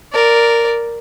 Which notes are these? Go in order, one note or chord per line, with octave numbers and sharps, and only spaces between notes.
A#4 D5